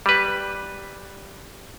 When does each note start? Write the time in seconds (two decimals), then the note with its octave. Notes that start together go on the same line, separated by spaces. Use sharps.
0.06 G3 B4